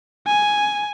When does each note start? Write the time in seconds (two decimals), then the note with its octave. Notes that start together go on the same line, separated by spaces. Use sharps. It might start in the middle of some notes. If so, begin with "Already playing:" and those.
0.27 G#5